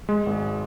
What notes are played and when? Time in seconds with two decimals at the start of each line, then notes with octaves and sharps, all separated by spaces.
0.09 G#3
0.26 G#1